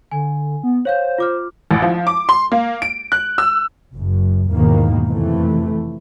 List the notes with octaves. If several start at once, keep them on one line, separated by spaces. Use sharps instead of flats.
D3 G#5
B3
C5 C#5 F5 G6
F4 D6 F6
A1
F3
D6
C6
A#3
D7
F#6
E6
F#1 F#2
E2 G#2 B2 D#3 A#3
F2 C3 E3 A3